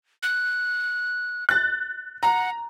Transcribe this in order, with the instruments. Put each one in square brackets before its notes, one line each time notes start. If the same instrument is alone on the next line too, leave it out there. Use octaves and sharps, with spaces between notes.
[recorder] F#6
[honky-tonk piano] F#6 A6
[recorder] F#5 [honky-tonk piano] A#5